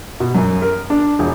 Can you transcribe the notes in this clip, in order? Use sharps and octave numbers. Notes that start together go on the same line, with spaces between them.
B2
F#2
A#4
D4
E1